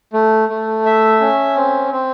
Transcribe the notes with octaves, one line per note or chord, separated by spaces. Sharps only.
A3
A3
E5
C#4
C4
C4